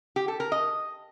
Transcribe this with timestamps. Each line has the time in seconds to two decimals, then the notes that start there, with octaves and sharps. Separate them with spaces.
0.16 G4
0.28 A4
0.40 A#4
0.52 D#5